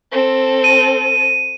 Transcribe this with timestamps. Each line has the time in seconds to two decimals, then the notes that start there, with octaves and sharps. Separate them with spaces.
0.12 C4 A4
0.64 D#7